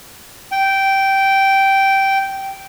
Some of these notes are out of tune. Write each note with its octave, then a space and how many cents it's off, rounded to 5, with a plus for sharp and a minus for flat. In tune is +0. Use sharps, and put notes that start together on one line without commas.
G5 -10